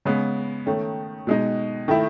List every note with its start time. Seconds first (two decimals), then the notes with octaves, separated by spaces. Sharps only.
0.05 C#3 G#3 B3
0.66 D#3 A3 C#4
1.27 B2 G#3 D#4
1.88 D#3 A3 E4